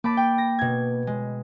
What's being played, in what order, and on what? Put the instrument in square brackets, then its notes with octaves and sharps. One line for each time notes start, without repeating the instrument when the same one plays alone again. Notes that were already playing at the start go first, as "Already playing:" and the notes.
[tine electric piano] A#3 [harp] A5 B5 D6
[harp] G5
A#6
B2 G#6
G#3